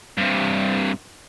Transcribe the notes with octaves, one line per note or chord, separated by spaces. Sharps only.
G2 C3